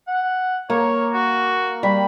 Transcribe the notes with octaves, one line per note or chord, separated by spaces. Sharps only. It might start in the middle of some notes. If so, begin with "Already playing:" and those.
F#5
A#3 C#5
F#4
G3 B5